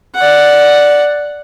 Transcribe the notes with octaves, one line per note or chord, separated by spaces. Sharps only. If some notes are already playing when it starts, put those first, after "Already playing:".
D5 F#5